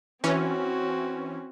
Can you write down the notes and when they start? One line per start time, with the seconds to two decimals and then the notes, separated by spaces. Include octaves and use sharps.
0.24 E3 C4 C#4 F#4